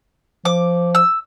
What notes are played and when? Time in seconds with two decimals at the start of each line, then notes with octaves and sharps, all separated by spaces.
0.45 F3 D6
0.95 E6